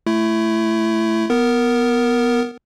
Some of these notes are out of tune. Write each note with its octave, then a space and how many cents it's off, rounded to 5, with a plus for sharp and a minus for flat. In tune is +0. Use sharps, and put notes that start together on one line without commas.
A3 +0 E4 +20
B3 +0 A#4 +0